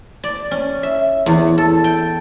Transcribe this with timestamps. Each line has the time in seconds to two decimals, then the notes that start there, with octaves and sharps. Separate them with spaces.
0.24 D5
0.51 C#4
0.83 E5
1.26 E2
1.58 A4
1.84 G5